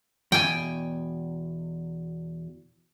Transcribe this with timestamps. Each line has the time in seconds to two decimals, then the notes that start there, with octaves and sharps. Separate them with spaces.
0.32 E2 B2 G5 G#5